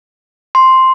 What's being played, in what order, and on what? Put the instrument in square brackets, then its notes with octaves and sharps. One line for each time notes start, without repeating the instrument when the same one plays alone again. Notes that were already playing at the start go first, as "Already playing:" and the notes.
[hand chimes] C6